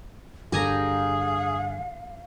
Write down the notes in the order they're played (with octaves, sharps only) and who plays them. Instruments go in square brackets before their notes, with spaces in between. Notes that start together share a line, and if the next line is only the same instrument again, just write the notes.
[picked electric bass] G2 D3 [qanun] G4 G#5 A#5 [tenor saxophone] G#4 [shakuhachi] F5